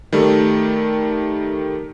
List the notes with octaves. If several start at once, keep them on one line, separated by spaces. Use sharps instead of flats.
D#3 G3 A3